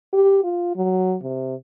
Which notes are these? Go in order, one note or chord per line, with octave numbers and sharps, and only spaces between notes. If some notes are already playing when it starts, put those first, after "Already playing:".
G4
F4
F#3
C3